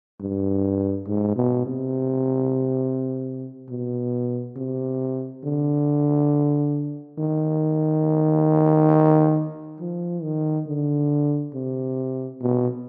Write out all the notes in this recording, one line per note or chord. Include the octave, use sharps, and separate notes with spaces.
G2
G#2
B2
C3
B2
C3
D3
D#3
F3
D#3
D3
C3
B2